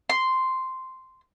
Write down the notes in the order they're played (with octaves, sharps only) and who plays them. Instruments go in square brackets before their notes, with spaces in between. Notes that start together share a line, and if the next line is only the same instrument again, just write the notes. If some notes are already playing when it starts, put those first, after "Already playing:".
[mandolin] C6